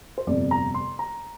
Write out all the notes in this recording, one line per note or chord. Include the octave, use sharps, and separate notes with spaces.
C5
G1 F2 C3 D5
A#5
C6
A#5